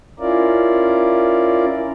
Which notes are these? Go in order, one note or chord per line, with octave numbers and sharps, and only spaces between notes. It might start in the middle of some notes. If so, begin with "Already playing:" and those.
C#4 E4 F4 A#4 D5